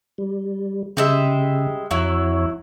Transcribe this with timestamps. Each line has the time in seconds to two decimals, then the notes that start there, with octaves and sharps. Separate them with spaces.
0.18 G3
0.97 C#3 G3 G#3 E5
1.91 F2 F#3 E4 C#5